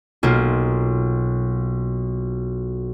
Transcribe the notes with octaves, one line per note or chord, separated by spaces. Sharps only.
B1 A#3 F4